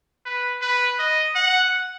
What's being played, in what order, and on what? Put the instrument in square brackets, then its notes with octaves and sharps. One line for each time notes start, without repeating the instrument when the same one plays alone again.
[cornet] B4
B4
D#5
F#5